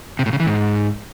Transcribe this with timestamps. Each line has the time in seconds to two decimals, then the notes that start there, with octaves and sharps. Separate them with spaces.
0.19 C3
0.26 A2
0.33 C#3
0.40 E3
0.47 G#2